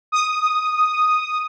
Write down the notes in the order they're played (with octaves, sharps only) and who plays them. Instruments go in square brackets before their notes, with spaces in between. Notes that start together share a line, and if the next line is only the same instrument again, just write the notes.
[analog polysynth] D#6